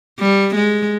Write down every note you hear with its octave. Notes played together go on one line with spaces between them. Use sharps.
G3
G#3